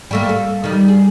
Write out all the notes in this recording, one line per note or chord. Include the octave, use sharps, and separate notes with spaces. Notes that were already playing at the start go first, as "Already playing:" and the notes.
G3 A3 A#3
A4
D#3 G3
G#4